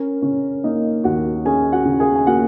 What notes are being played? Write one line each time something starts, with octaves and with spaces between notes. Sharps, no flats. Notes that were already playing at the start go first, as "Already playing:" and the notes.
Already playing: C#4 A#4
C#3 C#4 C#5
A#3 D#4 D#5
D#2 F#4 F#5
C#4 G#4 G#5
F#4 F#5
C#3
G#4 G#5
G#5
A#3 F#4 F#5